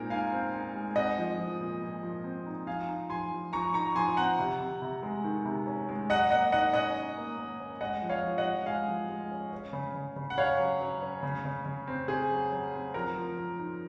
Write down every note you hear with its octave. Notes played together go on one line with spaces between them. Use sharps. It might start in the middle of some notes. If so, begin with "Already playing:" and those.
Already playing: A#2 G#3 C4 D#4 A#4
D#4 F5 G#5
C4
D#4
G#3
C4 D#5 F#5
F3
F3
A#2
A#2
F3
C4
D#4
F3 F5 G#5
D#4
F3 G#5 C6
F3
F3 A#5 C#6
D#4 A#5 C#6
F3 G#5 C6
C4 F#5 A#5
C3
C3
C3
G#3
D#3
C3
C#4
G#3
F#3 D#5 F#5
A#3 D#5 F#5
D#3 D#5 F#5
C#4 D#5 F#5
C#4
A#3
A#3
C#4
G#3 D#5 F#5
F3
C#5 F5
F3
D#5 F#5
F3
G#3 F5 G#5
F3
G#3
C#4
C#4
C#3
C#3
C#3
F#5
C#4 C#5 F5
F#3
F#3
C#4
C#3
C#3
C#3
C4
C4 G#4
F#3
F#3
C4
F3 A#4
F3
F3
D#4